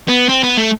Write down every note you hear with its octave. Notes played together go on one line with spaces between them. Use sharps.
B3
C4
B3
A3